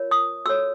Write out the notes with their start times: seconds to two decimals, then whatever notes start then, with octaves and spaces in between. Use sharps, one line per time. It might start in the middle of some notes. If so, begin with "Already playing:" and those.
Already playing: F4 A#4 C#5
0.11 D#6
0.45 F#4 A4 C#5 E6